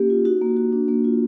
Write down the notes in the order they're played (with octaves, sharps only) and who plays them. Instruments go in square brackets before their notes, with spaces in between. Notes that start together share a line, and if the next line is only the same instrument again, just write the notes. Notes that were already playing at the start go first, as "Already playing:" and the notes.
Already playing: [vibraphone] A#3 C#4 G4
F4
D#4 F#4
A#3
F#4
D4
A#3
F4